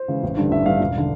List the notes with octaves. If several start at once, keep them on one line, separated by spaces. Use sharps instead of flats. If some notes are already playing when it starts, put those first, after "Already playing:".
Already playing: C5
C#3 E3 G#3
A1
G2 D3 G3
A1 E5
G2 D3 G3 F5
E1
D3